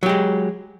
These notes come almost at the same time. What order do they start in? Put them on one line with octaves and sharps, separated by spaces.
F#3 G4 G#3